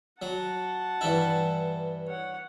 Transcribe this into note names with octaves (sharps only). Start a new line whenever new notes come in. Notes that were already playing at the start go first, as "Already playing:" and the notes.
F#3 F#5 A5
G2 E3 E4
C#5 F#5